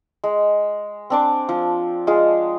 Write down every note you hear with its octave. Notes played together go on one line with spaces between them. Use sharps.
G#3
C4 D4 D6
F3
G#3 F4 G#4